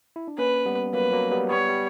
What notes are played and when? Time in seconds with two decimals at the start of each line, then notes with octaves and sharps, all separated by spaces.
0.16 E4
0.28 D4
0.38 A#3 C#4 B4
0.66 G3 B3
0.93 F#3 A#3 B4
1.12 F#3 A#3
1.31 G3 B3
1.49 G3 B3 C#5
1.69 G3